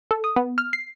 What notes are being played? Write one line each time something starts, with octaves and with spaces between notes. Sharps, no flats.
A4
D#6
B3
F6
C7